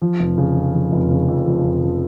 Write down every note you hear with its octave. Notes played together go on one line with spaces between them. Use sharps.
F3
F1
C#3
F2
F3
F1
C#3
F2
F3
F1
C#3